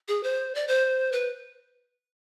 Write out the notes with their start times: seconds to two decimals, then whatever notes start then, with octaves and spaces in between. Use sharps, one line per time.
0.08 G#4
0.23 C5
0.55 D5
0.68 C5
1.12 B4